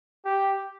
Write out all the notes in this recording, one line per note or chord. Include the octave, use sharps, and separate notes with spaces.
G4